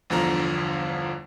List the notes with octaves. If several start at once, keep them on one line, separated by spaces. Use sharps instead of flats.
G1 E2 D3 F3 A#5